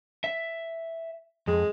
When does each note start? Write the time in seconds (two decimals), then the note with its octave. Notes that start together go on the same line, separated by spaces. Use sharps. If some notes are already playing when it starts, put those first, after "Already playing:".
0.24 E5
1.47 F2 G#3